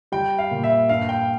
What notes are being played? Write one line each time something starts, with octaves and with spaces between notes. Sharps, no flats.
G3 G5
F5
A#2
E5
G2 F5
G5